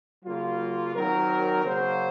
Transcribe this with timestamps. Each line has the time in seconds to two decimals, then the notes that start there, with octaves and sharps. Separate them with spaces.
0.24 C#3 F#3 A#3 F4
0.94 D#3 F#3 C4 A#4
1.64 C#3 F#3 A#3 C5